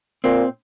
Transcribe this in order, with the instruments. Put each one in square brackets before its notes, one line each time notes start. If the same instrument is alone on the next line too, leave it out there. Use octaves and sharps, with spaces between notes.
[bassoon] A#2 [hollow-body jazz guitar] C4